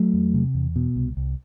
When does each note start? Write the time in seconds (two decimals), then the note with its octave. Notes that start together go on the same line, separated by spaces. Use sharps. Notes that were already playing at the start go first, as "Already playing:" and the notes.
Already playing: F#3 A3
0.13 E2
0.34 C3
0.55 E2
0.76 B2
0.96 C2
1.17 C2